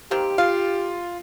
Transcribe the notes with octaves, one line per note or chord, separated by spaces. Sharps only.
D#3 A#3 C4 G4
F4 F5